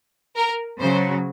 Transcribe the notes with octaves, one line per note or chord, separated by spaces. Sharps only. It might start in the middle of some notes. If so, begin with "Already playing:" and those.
A#4
C#3 F#3 C5